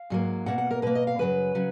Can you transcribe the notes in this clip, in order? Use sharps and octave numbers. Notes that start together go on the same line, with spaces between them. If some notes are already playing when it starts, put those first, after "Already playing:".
Already playing: F5
G#2 F#3 A#3
B2 A#3 F#5
F#5
A#4
B2 A#3 B4
D#5
F5
F#2 C#3 F#3 B4
C#3 F#3